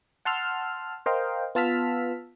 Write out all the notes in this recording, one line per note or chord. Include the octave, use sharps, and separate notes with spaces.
F#5 A5 C6 E6 F6
A#4 C5 D#5 F5 G5
B3 F4 A5 E6 F6 B6